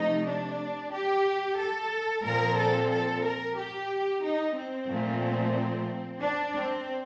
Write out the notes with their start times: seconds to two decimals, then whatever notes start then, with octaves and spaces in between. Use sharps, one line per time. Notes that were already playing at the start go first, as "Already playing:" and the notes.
Already playing: C3 F3 A3 D#4
0.26 D4
0.92 G4
1.58 A4
2.24 A#2 F3 C4 A#4
2.57 A4
2.91 A4
3.23 A#4
3.57 G4
4.23 D#4
4.56 C4
4.89 A#2 F3 A3
6.22 D4
6.56 C4